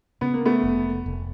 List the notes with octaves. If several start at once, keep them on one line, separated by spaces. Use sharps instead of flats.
C#3 B3
A#3
A3 B3
F1
F1